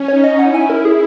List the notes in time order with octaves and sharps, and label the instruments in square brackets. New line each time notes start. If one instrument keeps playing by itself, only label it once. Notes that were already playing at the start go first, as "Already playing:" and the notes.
Already playing: [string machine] C#4
[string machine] D#4 [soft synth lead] C#5
[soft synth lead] D#5
[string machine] E4 [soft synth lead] F#5
[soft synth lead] G#5
A#4
G#4